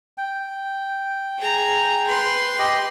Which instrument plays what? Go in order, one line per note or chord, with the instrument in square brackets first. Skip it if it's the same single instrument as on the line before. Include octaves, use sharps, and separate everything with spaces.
[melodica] G5
[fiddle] G#4 A#5
B4 C6
[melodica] G4 D#5 G5